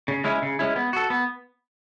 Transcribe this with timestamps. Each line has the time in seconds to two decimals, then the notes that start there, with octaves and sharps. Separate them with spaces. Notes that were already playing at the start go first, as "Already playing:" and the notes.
0.08 C#3
0.24 G#3 C#4 E4
0.42 C#3
0.59 G#3 C#4 E4
0.76 B3
0.93 F#4 A4
1.10 B3